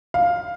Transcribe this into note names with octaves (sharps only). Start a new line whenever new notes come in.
F5